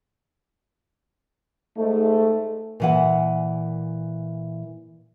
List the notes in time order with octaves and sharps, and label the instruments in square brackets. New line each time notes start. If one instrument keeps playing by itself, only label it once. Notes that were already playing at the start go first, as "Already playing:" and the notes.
[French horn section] G#2 G#3 A3
[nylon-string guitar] A#2 E3 F#5